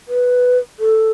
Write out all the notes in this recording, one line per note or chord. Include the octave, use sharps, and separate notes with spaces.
B4
A4